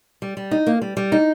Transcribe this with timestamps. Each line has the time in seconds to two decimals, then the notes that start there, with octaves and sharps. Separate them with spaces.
0.22 G3
0.37 G3
0.51 D#4
0.67 A#3
0.82 G3
0.97 G3
1.12 D#4